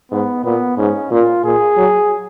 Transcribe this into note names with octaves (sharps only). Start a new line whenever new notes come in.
G#2 B3
A#2 B3
G#2 C#4
A#2 F4
A#2 G#4
F#3